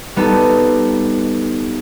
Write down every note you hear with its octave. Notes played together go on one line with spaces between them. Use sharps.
G3 B3 D#4 A4